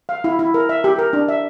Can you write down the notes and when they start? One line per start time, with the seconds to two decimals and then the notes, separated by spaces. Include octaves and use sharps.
0.09 F5
0.24 E4
0.39 E4
0.54 A#4
0.69 E5
0.84 G4
0.99 A#4
1.13 D4
1.29 E5